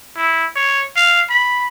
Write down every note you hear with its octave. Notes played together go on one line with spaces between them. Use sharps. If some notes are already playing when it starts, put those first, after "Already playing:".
E4
C#5
F5
B5